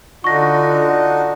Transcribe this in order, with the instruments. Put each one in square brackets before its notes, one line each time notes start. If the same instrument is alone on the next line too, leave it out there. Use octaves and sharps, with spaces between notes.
[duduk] D3 [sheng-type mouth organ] D4 D#4 F#4 [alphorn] F4 [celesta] C#6 A#6